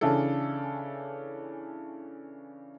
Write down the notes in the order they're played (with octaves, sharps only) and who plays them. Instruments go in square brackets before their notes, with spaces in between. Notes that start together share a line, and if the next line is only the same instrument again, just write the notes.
[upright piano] C#3 E3 C#4 D4 A4